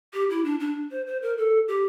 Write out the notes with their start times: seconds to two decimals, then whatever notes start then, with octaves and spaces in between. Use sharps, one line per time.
0.14 G4
0.30 E4
0.45 D4
0.60 D4
0.91 C5
1.07 C5
1.22 A#4
1.38 A4
1.68 G4